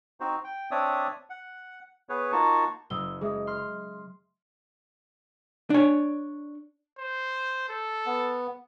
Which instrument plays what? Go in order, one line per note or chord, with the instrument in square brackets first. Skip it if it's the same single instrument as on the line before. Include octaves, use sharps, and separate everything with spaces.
[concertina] C4 D#4 F#4 C5
G5
C4 D4 C#5 D5 E5 D#6
F#5
B3 G#4 B4 C#5
A#3 D#4 F4 F#4 A5 C#6
[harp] F#1 [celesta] D#6 E6 G7
[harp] G#3 [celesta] G#4 E5 D#6
[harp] C6 F6
[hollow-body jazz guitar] D4 C#5
[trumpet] C5
A4
[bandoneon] B3